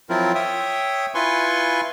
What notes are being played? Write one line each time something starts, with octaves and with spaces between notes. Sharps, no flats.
F3 F#3 C4 E4 F4 A#4
C#5 E5 G5 D#6
E4 F4 B4 G#5 C6 C#6